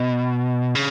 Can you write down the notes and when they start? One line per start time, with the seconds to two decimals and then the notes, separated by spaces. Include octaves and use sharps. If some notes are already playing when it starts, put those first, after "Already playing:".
Already playing: B2
0.75 C#3